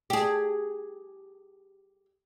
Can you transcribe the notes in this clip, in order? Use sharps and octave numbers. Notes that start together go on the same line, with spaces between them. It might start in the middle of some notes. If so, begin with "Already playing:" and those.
G4 G#4